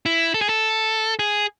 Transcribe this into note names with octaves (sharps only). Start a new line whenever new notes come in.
E4
A4
G#4
A4
G#4